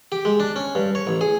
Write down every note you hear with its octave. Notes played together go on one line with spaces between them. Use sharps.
G4
G#3
D4
C#4
G2
C#5
A1
G#4